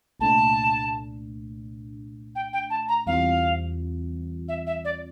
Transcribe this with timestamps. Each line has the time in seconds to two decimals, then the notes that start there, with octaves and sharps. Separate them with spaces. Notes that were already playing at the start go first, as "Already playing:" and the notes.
0.20 C2 A#2 A3 D4 A5
2.35 G5
2.53 G5
2.70 A5
2.88 A#5
3.06 E2 E3 G3 C4 F4 F5
4.48 E5
4.66 E5
4.84 D5